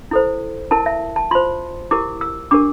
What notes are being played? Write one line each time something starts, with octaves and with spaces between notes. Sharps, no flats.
E4 A4 C5
E4 A#4 A5
E5
A5
F4 C5 C6
E4 G4 A#4 D6
E6
D4 G4 A#4 D6